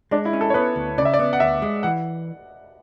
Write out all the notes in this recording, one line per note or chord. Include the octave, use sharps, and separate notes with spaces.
G#3 D4
E4
C#4
A4
C#5
B3 B4
D2
C#3 D5
E5
D5
B3
F#5
D2 E5
G#3
E3 F#5